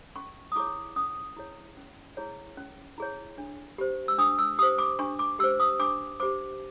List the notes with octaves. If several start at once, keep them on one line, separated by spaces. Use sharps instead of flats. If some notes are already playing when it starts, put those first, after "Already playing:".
C#4 C#6
D#6
E4 G#4 C#5 D6
C#4 D#6
E4 G#4 C#5
C#4
E4 G#4 C#5
C#4
E4 G#4 C#5
D4
G4 C5
E6
D4 D#6
E6
G4 C5 D#6
D6
D4 C#6
D6
G4 C5 E6
D#6
D4 D6
G4 C5 D6